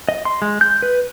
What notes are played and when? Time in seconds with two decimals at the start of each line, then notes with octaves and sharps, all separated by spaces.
0.09 D#5
0.25 C6
0.42 G#3
0.61 G6
0.82 B4